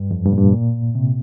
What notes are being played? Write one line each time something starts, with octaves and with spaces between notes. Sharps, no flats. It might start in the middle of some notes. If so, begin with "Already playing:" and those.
Already playing: G2
F2
G2
A#2
G2
A#2
C3